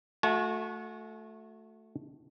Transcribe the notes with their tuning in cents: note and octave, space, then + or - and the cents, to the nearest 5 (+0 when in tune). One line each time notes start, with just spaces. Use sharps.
A3 +0 F#4 -30 G#5 +45